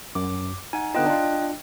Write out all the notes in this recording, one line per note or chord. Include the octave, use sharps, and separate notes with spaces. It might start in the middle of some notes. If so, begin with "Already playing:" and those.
F#2 D6
D#4 F#5 G#5
D3 B3 F4 D#5 G5 F#6
D4 F4